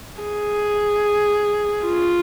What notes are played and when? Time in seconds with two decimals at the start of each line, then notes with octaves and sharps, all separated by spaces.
0.21 G#4
1.86 F4